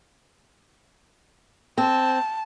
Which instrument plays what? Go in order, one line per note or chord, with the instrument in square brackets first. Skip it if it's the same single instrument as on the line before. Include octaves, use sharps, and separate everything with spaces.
[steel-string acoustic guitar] C4 [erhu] A5